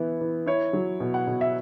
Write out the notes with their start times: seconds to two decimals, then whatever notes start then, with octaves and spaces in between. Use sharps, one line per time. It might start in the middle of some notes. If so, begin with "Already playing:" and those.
Already playing: E3 B3 E4
0.21 E3
0.46 E4 C#5
0.73 F#3
1.00 B2
1.14 F#5
1.27 B2
1.41 E5